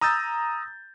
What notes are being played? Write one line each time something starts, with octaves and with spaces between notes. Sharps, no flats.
A#5 D#6 E6 G6 A6